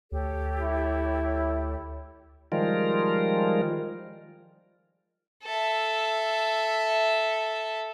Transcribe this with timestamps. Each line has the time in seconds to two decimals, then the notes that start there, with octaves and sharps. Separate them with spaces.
0.12 D2 G4 A4 C#5
0.61 E4
2.52 D#3 F3 G3 G#3 F4 A#4
5.43 A4 E5